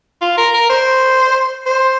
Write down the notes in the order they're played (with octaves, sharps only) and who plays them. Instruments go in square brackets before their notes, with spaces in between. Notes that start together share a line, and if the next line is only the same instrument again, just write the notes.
[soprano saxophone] F4
A#4
A#4
C5
C5